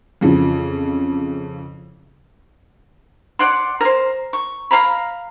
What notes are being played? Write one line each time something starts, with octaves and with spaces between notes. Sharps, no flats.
F2 C#3 E3 F3
D5 F#5 C6
A#4 C5
C#6
A#4 F5 A#5 B5